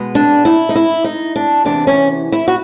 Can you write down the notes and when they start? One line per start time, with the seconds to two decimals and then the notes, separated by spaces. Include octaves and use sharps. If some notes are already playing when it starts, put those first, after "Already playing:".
Already playing: B2 G#3 B3
0.15 D4
0.45 E4
0.69 D#4
0.76 E4
1.04 D#4
1.36 D4
1.65 E2 C3 E3 D4
1.87 C#4
2.32 E4
2.48 F#4